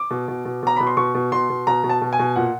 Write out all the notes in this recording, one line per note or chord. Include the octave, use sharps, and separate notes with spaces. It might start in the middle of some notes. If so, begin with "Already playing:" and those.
Already playing: D6
B2
B2
B2
B2 A#5
B2 B5
C6
B2 C#6
B2
B2 C6
B2
B2 A#5
B2
A5
B2
G#5
B2
A#2 F#5